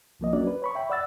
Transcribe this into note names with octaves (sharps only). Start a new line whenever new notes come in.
C2 F3 A#3 D#5
F#3 A#3 C#4 D4 F#4 D5
B4
C#5 B5 C#6
E5 G5 B5
D5 F#5 E6 A6